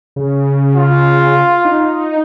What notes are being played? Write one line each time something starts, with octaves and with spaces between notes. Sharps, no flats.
C#3
F4
D#4